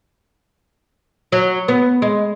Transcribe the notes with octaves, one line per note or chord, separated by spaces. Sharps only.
F#3
B3
G#3